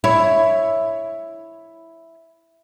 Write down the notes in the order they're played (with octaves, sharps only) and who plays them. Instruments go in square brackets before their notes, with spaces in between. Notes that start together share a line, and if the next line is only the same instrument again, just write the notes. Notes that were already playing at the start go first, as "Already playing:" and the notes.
[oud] E4 C#5